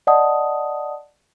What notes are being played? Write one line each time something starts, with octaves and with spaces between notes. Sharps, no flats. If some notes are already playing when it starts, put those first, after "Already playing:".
D5 D#5 F#5 A5 D#6